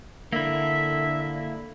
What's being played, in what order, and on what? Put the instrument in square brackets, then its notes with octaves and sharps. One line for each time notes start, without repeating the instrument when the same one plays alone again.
[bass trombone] D3 [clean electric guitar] A#3 E4 [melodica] E5